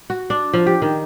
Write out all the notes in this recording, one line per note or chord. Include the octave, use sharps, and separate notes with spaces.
F#4
D4
F3
G4
D#3